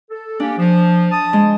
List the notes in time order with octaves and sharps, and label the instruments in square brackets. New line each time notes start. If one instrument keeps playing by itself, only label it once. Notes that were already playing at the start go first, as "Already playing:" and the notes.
[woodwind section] A4
[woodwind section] A#3 C#4 G4 [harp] D4
[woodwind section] F3
A5 D#6
[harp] G#3